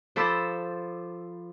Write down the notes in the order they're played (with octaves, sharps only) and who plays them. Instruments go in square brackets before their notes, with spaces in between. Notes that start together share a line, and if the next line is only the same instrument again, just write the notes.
[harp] F3 A4 C5 B5 D6 E6